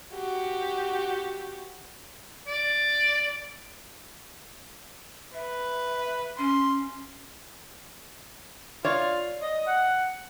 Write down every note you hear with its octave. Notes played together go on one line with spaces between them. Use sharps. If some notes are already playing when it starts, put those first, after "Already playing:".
F#4 G4
D5
B4 E5
C#4 C6
F4 C#5 D5
D#5
F#5